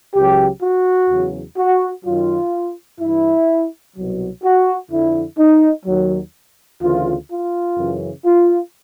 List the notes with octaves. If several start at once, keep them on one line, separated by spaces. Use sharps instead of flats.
C#2 C#3 F#3 G4
F#4
E2 C#3 F#3
F#4
F#2 D#3 F#3 F4
G2 E3 E4
C2 B2 F#3
F#4
F2 D3 F3 E4
D#4
D#2 D#3 F#3
D2 C#3 E3 F4
F4
F#2 C#3 E3
F4